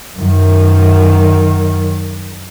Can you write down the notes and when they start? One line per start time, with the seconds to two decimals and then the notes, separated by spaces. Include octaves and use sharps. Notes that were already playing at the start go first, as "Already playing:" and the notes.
0.18 F#2 D#3